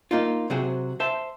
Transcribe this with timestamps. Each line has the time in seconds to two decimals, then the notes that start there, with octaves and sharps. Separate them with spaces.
0.11 A#3 D#4 F4
0.50 C3 F#3 F#4 G#4 C5
1.00 C5 E5 A5